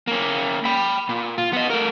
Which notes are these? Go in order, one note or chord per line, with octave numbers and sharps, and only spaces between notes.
A#3 C#4
G5 B5
A#2
F4
B3 D#5
A3 A#4